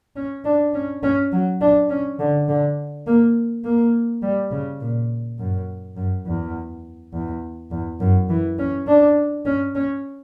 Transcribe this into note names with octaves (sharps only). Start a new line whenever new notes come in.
C#4
D4
C#4
C#4
F#3
D4
C#4
D3
D3
A#3
A#3
G3
C#3
A#2
F#2
F#2
E2
E2
E2
F#2
E3
C#4
D4
C#4
C#4